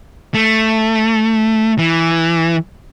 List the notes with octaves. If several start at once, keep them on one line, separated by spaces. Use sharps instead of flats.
A3
E3